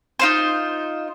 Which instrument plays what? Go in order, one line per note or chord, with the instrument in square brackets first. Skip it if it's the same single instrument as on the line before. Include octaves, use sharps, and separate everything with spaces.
[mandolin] D#4 F4 C5